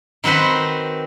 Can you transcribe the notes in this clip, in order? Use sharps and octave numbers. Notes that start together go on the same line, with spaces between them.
D#3 C4 F#4 B4 C6